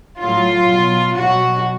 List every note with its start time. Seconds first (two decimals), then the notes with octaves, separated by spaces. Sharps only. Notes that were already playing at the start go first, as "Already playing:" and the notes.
0.20 A2 F#3 F4
0.69 B2 F#3
1.18 B2 F#3 F#4